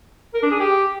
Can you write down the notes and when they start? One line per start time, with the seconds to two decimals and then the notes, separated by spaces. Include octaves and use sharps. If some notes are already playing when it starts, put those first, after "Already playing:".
0.34 A#4
0.43 D4
0.51 G#4
0.60 G4